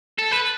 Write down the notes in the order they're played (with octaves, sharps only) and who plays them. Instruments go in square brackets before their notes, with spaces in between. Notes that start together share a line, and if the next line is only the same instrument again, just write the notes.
[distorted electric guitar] A4
B4